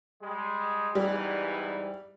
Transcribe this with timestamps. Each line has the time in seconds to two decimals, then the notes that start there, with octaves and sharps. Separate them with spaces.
0.22 G3 G#3
0.95 G#2 E3 G3 B3